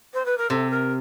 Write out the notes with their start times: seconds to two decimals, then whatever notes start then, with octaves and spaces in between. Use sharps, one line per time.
0.14 C5
0.25 B4
0.38 A#4
0.50 C3 A4
0.70 A#4